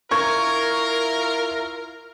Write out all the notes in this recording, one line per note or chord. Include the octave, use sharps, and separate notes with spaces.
E4 F4 A#4 C#6 G#6